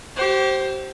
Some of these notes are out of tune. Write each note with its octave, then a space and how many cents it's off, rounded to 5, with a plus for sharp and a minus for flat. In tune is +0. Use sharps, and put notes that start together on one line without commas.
G4 -30 C5 +10